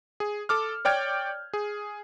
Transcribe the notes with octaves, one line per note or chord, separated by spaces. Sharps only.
G#4
A4 D6 F6
C#5 D5 G5 F6 G6 G#6
G#4